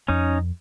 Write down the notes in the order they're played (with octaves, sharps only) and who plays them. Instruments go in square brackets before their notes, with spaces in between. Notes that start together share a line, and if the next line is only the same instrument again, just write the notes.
[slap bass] F2 [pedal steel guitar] C#4 D#4